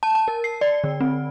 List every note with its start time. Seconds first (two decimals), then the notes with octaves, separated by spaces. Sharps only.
0.03 A5
0.15 A5
0.28 A#4
0.44 C7
0.61 D5
0.84 D3
1.01 C4